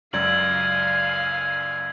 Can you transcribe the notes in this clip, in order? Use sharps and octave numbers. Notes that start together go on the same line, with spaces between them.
C#2 F#2 D5 F5 G#5 E6 G#6 F#7